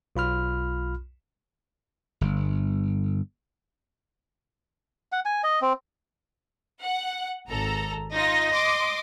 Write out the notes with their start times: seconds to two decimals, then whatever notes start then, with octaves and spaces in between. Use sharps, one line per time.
0.16 B1 F4 B5 F6
2.21 G1
5.12 F#5
5.25 G#5
5.44 D#5
5.62 C4
6.82 F#5
7.48 G#1 A4 A#5
8.13 D#4 F4 D#5 A#6
8.52 C6 D6 D#6